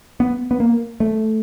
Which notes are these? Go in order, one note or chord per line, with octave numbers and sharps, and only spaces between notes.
B3
B3
A#3
A3